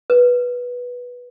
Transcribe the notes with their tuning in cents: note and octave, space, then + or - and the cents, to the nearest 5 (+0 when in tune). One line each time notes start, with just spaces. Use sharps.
B4 -10